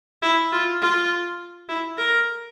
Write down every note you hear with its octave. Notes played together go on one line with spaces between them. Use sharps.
E4
F4
F4
E4
A#4